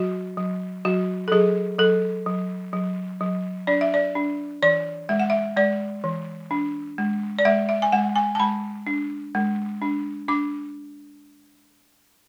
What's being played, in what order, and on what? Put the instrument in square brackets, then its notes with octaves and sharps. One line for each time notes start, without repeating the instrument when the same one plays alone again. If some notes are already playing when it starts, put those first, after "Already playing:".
Already playing: [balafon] F#3 F#4
F#3
F#3 F#4
A4
F#3 G#4
F#3 A4
F#3
F#3
F#3
D4 D5
E5
D5
D4
E3 D5
G#3 E5
F#5
E5
G#3 D5
E3
D4
G#3
D5
G#3 E5
E5
G#5
G#3 F#5
G#5
A5
G#3 B5
D4
G#3
D4
D4 D6